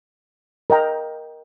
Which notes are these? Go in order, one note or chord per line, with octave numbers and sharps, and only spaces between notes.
A#4 D#5 G5 A#5